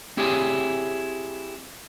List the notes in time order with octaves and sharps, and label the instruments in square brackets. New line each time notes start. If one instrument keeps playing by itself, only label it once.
[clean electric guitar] C4 E4 G4 G#4 C#5 G#5